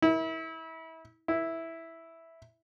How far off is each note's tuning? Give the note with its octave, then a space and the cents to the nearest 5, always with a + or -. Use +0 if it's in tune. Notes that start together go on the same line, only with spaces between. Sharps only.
E4 -30
E4 -5